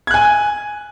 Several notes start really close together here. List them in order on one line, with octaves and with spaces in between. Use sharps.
G#6 F#6 G#5